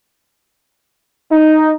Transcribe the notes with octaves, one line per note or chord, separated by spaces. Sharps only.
D#4